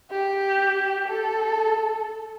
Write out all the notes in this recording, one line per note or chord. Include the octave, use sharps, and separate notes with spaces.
G4
A4